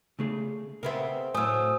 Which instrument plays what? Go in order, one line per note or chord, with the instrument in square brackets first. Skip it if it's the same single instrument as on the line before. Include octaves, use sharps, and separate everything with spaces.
[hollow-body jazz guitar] C#3 A3 G#4
[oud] C#3 B3 C4 [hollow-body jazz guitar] A#4 E5
[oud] A2 F#3 [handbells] C5 E6 [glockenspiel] G#5 D#6